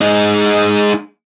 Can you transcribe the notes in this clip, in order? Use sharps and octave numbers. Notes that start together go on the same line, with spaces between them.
G#3 D#4